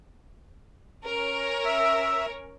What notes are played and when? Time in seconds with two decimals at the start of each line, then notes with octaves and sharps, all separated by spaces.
1.06 C#4 A#4 C#5
1.65 E5